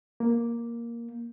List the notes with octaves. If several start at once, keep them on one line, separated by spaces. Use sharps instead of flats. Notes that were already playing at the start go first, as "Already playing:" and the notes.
A#3